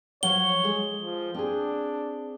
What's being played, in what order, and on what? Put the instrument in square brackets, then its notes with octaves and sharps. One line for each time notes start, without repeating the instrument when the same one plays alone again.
[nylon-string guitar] F3 F#3 F#5 [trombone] C#5 [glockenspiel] G7
[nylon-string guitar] G#3 G#4 A4
[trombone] F3
[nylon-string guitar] C4 G#4 [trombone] D4